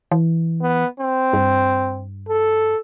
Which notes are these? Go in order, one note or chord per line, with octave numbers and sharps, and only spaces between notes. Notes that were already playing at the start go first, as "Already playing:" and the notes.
E3
B3
C4
G2
A4